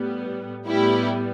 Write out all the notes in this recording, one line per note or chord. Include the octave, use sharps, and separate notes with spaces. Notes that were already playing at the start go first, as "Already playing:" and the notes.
Already playing: A2 G3 B3
A2 G3 B3 E4 G4